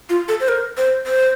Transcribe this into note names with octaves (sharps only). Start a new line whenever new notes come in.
F4
A4
C5
A#4
C5
C5